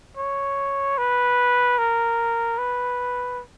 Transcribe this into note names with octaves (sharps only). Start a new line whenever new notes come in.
C#5
B4
A#4
B4